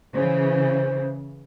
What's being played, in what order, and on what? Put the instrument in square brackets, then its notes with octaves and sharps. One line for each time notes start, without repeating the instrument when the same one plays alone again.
[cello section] C#3 E3 [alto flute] C5